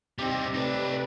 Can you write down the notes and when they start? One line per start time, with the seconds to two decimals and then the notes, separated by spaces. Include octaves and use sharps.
0.18 C3 G3 C4 D#4 G4
0.54 A3 D#4 B4 D5